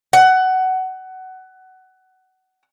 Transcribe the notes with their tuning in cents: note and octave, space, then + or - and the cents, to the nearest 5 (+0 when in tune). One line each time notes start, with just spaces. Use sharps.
F#5 +20